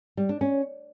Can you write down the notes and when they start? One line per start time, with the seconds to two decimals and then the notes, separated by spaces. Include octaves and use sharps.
0.17 G3
0.29 D4
0.41 C#4